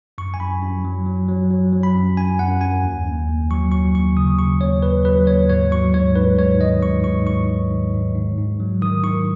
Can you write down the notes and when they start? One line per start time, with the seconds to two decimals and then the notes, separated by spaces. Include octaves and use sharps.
0.18 F#2 C#6
0.34 G#5
0.40 F#2 B5
0.62 F#2
0.85 F#3
1.07 F#3
1.29 F#3
1.50 F#3
1.73 F#3
1.83 B5
1.95 F#2
2.17 F#2 G#5
2.39 F#2 F#5
2.61 F#2 G#5
2.84 D#2
3.06 D#2
3.28 D#2
3.51 F#3 C#6
3.72 F#3 C#6
3.94 D#2 C#6
4.17 C#3 D#6
4.39 C#3 C#6
4.60 D#2 C#5
4.82 D#2 B4
5.05 F#3 B4
5.27 D#2 C#5
5.49 G#2 C#5
5.71 F#3 C#6
5.94 G#2 C#5
6.16 G#2 B4
6.38 G#2 C#5
6.61 D#3 D#5
6.83 G#2 C#6
7.04 G#2 C#6
7.26 G#2 C#6
7.49 D#3
7.71 G#2
7.94 G#2
8.15 G#2
8.38 G#2
8.60 F#3
8.82 D#3 D#6
9.03 D#3 C#6